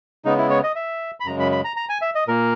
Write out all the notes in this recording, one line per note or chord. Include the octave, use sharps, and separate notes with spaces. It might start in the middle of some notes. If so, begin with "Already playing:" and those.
C#3 G#3 B3 D#4
E4
C#5
D#5
E5
B5
F#2 C#3 G#3 A#5
B5
B5
A#5
A#5
G#5
E5
D#5
A#2 A#3 A#4